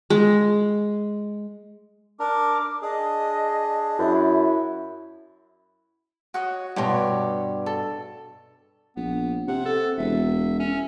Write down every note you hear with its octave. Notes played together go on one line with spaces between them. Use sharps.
G#3
D4 A#4 D6
D4 G#4 D#5
F#2 E4
F#4 C#5 D#5
G2 B2 G4 C#5 C6
A4
A#1 B3
C3 F#5
A4
E1 E5
C#4